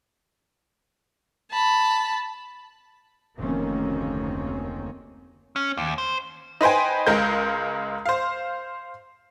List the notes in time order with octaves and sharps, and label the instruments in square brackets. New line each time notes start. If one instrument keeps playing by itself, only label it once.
[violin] A5 B5
[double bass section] F1 D2 D#3 A#3 C4 C#4
[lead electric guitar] C#4
D#2
C5
[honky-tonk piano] D#4 B4 C5 G5 G#5
C#2 G#3 A#4 G6
C5 F5